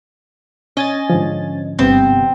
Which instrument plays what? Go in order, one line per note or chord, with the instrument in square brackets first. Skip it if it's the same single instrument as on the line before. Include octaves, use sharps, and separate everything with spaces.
[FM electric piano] C#4 G#5 A6 [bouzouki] D#5
[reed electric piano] G#2 D3 F3
[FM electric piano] G1 C3 B3 [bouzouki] C4